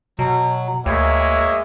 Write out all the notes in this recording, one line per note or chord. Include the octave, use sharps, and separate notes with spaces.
B2 F#3
D2 G#3 A#3 C#5 E5